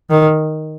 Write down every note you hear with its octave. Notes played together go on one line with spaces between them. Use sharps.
D#3